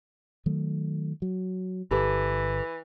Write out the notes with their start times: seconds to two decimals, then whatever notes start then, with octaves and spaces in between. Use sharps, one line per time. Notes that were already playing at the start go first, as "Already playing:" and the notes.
0.46 D#3 F#3 A3
1.22 F#3
1.91 G1 E3 G4 A4 B4